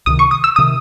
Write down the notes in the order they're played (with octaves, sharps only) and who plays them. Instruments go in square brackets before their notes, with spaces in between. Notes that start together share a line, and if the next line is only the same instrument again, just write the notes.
[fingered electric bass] C#2 C3 D#3 [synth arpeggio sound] D#6
[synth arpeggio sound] C#6
D#6
E6
[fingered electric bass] C3 D#3 [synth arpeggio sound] D#6